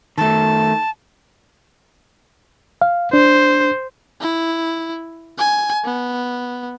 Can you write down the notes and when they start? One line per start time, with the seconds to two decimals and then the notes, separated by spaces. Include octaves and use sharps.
0.18 D#3 A3 A5
2.82 F5
3.13 D4 C5
4.21 E4
5.38 G#5
5.85 B3